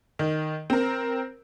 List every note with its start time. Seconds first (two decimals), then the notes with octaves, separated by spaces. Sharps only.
0.19 D#3
0.70 C4 A#4